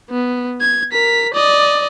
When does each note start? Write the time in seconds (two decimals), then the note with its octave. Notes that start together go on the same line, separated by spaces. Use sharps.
0.10 B3
0.61 G#6
0.92 A#4 B6
1.34 D5 D#5